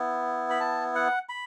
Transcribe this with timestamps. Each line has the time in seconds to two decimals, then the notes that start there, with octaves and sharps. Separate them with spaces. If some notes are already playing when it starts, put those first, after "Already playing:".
Already playing: B3 E4
0.50 B5
0.60 A5
0.95 F#5
1.29 B5